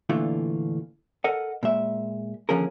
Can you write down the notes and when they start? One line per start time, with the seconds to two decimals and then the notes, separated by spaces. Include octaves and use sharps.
0.09 A#2 D3 E3 A3 F4
1.24 A4 A#4 D#5 F#5
1.63 A#2 G#3 E5
2.49 D#2 D3 F3 C#4 G#4 A#4